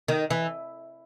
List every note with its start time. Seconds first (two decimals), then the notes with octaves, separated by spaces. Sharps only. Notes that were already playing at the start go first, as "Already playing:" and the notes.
0.08 D#3
0.30 E3